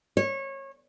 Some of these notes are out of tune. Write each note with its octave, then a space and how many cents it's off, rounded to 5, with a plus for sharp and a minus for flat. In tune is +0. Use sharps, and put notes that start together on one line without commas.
C#5 -25